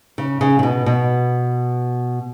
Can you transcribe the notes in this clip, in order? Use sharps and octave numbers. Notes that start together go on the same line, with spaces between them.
C#3
C#3
C#3
B2
B2